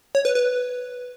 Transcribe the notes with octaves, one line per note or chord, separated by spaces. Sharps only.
C#5
B4
B4